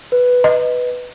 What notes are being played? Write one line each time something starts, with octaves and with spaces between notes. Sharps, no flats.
B4
D#5